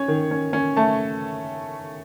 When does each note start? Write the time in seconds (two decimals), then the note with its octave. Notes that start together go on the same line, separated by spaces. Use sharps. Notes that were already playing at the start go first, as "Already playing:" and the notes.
Already playing: C#4 C#5
0.08 D#3
0.31 C#4
0.53 C#4
0.77 A3 A5